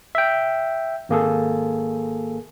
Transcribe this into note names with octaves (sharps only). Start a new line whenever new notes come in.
E5 G5
G#1 A#3 G#4 A4